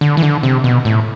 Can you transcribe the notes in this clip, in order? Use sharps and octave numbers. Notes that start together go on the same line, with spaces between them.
D3
E3
D3
C3
B2
A2